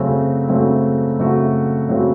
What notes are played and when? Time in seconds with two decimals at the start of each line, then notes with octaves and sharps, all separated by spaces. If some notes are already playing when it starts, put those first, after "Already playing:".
Already playing: F#2 C#3 A3 C4 F#4
0.49 F#2 C#3 A3 C4 F#4
1.19 F#2 C#3 A3 C4 F#4
1.89 F#2 C#3 A3 C4 F#4